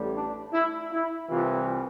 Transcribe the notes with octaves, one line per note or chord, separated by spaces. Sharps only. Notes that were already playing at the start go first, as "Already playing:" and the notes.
Already playing: A1 A2 G3
D4
E4
E4
C2 C3 E3 F4